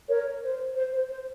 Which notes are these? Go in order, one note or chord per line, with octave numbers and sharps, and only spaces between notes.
A#4 C#5
C5
C5
C5
C5